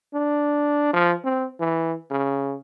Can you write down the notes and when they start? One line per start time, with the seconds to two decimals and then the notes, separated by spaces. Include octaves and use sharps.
0.14 D4
0.93 F3
1.24 C4
1.60 E3
2.11 C#3